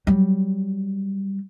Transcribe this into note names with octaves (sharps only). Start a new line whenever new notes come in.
F#3 G3